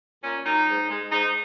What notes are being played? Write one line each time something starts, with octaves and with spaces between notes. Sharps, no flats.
A#2 C#4
F#3 A#3 D#4
G#2
G#3
G#2 D#4